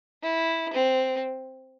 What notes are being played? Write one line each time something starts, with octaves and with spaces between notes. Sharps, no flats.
E4
C4